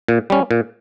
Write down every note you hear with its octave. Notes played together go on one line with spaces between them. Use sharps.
A#2
G3 C#4
A#2